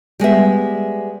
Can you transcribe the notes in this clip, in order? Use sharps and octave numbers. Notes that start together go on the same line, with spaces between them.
G3 G#3 B3 E5